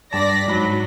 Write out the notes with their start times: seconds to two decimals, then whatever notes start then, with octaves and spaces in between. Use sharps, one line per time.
0.13 G2 D5 A5 A#6 B6
0.48 G#2 F#3 B5